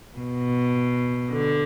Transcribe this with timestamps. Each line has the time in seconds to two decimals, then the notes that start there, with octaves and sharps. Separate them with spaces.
0.17 B2
1.33 D3